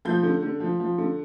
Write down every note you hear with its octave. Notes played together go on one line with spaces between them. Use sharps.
F3 G6
D3
D3
F3
F3
D3